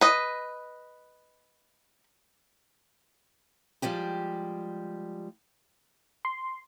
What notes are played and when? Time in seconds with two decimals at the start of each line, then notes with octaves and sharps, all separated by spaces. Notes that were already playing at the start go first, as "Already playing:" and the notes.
0.01 B4 D#5
3.82 F3 G3 G#3 G4
6.25 C6